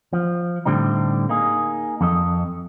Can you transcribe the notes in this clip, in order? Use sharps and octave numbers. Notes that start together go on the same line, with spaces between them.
F3
A2 D3 G3 C4 D#4
A#3 D#4 G#4
F2 A4 D#5